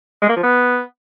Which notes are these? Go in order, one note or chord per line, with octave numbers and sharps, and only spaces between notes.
G#3
A#3
F3
B3